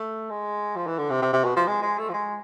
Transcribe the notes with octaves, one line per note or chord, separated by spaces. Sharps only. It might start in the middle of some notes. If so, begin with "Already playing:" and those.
Already playing: A3
G#3
F3
E3
D3
C3
C3
C3
B2
F3
G#3
G#3
A3
F3
G#3